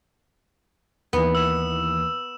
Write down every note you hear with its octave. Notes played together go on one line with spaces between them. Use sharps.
D#2 E3 B3
E6 E7